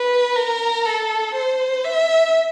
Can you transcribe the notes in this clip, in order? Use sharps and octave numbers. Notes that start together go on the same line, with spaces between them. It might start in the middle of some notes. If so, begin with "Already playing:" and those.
Already playing: B4
A#4
A4
C5
E5